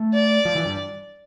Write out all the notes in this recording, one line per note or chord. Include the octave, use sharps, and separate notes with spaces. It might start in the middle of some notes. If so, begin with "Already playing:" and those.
Already playing: A3
D5
F3
E3
G2